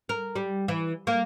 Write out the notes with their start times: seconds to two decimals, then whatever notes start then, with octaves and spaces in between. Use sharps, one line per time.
0.09 A#4
0.36 G3
0.68 E3
1.07 A#3